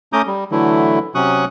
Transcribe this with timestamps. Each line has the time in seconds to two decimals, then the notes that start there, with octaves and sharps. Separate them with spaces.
0.13 A3 C#4 A#5 D6 D#6 G6
0.27 G3
0.51 D3 E3 F#3 A3 E4
1.15 C3 F#3 C#4 C#6 D#6 F#6